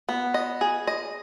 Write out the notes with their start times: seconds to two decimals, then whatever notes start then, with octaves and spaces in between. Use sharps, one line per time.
0.09 B3
0.34 D#5
0.61 G#4
0.87 D#5